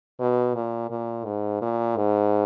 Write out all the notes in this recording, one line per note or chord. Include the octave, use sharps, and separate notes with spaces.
B2
A#2
A#2
G#2
A#2
G#2